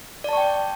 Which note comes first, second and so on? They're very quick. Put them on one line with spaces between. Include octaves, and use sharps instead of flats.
D5 A5 C#6 G5